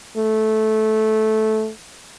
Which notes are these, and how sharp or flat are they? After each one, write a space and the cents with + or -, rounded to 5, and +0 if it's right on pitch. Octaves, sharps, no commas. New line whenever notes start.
A3 -15